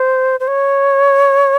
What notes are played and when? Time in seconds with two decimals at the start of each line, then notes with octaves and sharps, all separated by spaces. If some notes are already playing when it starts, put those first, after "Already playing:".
Already playing: C5
0.40 C5
0.48 C#5